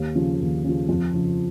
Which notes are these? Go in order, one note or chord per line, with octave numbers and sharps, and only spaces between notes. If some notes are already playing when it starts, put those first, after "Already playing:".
Already playing: D#2
C#3 F3
D#2
C#3 F3
F2
C#3 F3